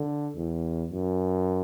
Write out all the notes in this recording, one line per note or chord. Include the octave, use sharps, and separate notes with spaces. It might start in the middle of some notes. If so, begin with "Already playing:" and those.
Already playing: D3
E2
F#2